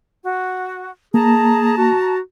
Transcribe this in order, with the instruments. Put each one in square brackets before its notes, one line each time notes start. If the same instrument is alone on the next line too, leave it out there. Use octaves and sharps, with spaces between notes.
[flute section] F#4
[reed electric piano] A#3 [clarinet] G#4 [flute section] A5 A#5
[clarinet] F#4